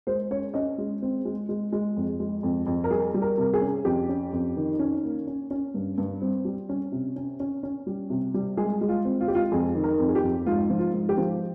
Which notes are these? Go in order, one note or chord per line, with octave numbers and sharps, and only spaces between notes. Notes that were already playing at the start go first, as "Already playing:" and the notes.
G#3 C5
C#4 C#5
C#4 D#5
G#3
C4
G#3
G#3
G#3
F2
G#3
F2
F2
A#4
G3 G#4
G3
A#4
C3 A#4
G#4
C#4
F2 G4
C#4
F2
D#3
C#4
A#3
C#4
C#4
G2
G2
C4
G3
C#4
C3
C#4
C#4
C#4
G3
C3
G3
G#3 G#4
G#3
F4
C4
F4
G#3 G4
F4
F2 G#4
D#3
A#4
F2
G#4
G4
F2
G#2 F4
F3
F4
G#2
G4
F3